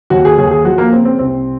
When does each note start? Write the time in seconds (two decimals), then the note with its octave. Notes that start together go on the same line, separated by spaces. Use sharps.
0.10 D#2 F#4
0.25 G#4
0.38 D#2 G#4
0.51 G#4
0.64 F3 F#4
0.78 A#3
0.92 C#3 C4
1.05 C4
1.19 C2 C4